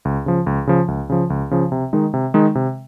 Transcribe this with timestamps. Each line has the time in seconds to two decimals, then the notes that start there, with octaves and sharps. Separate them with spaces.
0.05 C#2
0.26 C#3 F3
0.46 C#2
0.67 C#3 F3
0.88 C#2
1.10 C#3 F3
1.30 C#2
1.51 C#3 F3
1.72 C3
1.93 D#3 G#3 D#4
2.14 C3
2.34 D#3 G#3 D#4
2.55 C3